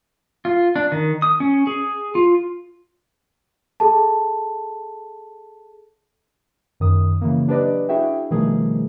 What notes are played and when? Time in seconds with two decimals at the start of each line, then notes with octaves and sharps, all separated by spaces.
0.45 F4
0.76 D4
0.92 D#3
1.22 D#6
1.40 C#4
1.67 G#4
2.15 F4
3.80 G#4 A4 A5
6.80 F#2 D#3 D#6
7.21 C#3 E3 A#3
7.48 F#3 D4 G4 B4 D5 D#5
7.89 D4 E4 F#4 G#4 E5 G5
8.31 B2 D#3 F3 G3 A3 G#4